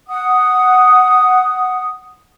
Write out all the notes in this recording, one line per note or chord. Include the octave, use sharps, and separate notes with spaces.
F#5 D#6